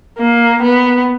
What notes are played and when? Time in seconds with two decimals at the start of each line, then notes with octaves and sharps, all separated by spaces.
0.18 A#3
0.62 B3